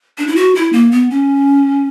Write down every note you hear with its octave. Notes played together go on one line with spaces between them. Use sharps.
D4
E4
F#4
E4
A#3
B3
C#4